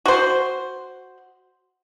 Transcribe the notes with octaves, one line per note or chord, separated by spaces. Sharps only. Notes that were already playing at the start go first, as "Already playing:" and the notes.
F#4 C5